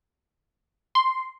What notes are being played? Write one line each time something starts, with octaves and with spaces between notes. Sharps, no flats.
C6